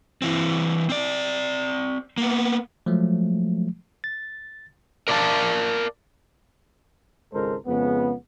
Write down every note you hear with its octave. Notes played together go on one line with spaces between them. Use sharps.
E3 C4
C4 D5
A#3 B3
F3 F#3 G#3 A3
A6
A#4 D5 F5 A5
G#1 C#2 G#3 A4 A#4 C5
F2 C#3 G#3 B3